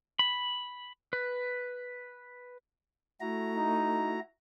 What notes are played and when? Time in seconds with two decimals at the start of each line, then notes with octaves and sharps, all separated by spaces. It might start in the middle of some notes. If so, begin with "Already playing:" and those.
0.19 B5
1.13 B4
3.21 A3 E4 F#4 A#5
3.57 D#4